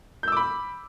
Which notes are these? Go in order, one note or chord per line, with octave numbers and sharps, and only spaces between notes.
B5 D6 E6 G6